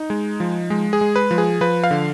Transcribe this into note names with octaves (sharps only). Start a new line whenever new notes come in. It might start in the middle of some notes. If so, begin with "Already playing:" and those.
Already playing: D#4
G#3
F3
G#3
G#4
G#3
B4
F3
G#4
F3 B4
F5
D3